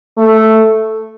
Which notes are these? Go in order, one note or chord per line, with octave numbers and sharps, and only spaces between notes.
A3